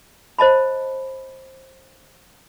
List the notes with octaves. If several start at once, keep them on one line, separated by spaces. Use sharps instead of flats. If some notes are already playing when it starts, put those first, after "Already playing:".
C5 D#5 A5 B5